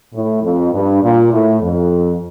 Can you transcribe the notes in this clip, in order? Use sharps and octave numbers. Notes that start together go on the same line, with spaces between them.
A2
F2
G2
A#2
A2
F2